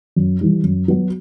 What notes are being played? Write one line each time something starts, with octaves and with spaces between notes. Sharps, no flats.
F#2
E3 G3
F#2
F#3 B3 F#4